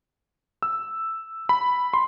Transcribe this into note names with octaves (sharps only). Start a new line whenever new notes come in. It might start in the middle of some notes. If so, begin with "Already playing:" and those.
E6
B5
C6